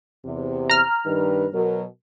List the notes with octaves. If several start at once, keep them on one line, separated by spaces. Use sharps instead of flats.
E2 C3
A#5 F6
G2 D#3 B4
B2 F#3 A#4